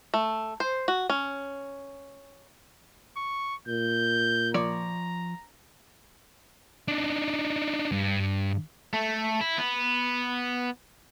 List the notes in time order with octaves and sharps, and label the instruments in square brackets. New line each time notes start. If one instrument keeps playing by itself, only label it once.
[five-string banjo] A3
C5
F#4
C#4
[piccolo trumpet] C#6
[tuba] A#2 [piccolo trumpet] G6
[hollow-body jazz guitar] F3 C#5 D5 [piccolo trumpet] A#5
[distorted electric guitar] D4 D#4
G2
[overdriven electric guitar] A3
E4
B3